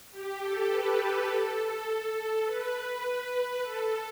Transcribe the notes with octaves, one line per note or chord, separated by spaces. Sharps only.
G4
A4
B4
A4
A4
B4
B4
A4